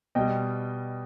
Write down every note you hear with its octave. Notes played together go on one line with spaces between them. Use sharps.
B2 G3 D#5 G5